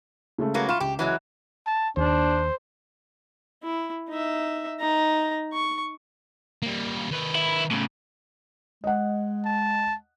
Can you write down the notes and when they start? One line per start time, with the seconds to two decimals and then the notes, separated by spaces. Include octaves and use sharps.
0.38 C#3 G#3 A3
0.54 F#3 A#3 B3
0.69 F4 B5 C#6 E7
0.80 C#2 G4
0.99 E3 F#3 G#3
1.66 A5
1.97 D#2 D4 C5
3.63 E4
4.08 D#4 E5
4.80 D#4 A#5
5.53 C#6
6.62 G3 A#3
7.11 D#3 B4
7.35 E4
7.71 A2 C#3
8.84 G#3 D#5 F#5
9.45 A5